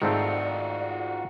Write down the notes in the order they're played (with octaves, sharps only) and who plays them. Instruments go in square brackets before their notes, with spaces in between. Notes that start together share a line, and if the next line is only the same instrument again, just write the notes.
[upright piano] G#2 [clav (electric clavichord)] D#3 A3 C4 [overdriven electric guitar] F4 F#4 [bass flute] D5